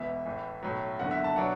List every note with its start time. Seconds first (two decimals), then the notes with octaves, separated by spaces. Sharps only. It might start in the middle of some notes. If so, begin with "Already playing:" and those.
Already playing: E1 E2 E3 E5
0.26 A1 A2 E3
0.63 B1 A2 F#3
0.99 F#1 E2 D3 F#5
1.11 E5
1.24 A5
1.36 B2 F#3 D4 F#5